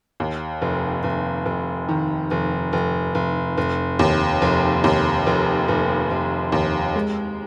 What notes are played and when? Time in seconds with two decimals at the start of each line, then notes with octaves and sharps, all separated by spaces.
0.20 D#2
0.62 F1
1.04 F1
1.45 F1
1.89 D#3
2.31 F1
2.73 F1
3.15 F1
3.57 F1
3.99 D#2
4.42 F1
4.84 D#2
5.27 F1
5.68 F1
6.11 F1
6.52 D#2
6.96 G#3